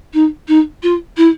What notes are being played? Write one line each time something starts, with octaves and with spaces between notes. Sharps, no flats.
D#4
D#4
F4
E4